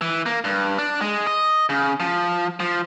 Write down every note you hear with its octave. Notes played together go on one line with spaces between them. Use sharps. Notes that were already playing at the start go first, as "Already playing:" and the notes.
E3
A#3
G2
D4
G#3
D#5
C#3
F3
F3